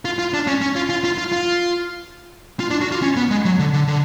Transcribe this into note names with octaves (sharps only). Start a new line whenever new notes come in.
F4
F4
D4
C#4
C#4
F4
F4
F4
F4
F4
F4
D4
F#4
F4
C#4
B3
G#3
F#3
D3
D3
D3